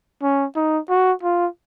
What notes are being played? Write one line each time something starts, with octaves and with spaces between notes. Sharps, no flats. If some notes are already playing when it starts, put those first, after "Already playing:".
C#4
D#4
F#4
F4